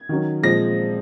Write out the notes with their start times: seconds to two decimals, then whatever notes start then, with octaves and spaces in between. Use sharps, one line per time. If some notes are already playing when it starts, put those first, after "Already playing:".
Already playing: G#6
0.09 D#3 F#3 C#4
0.43 A#2 F3 G#3 C4 A#6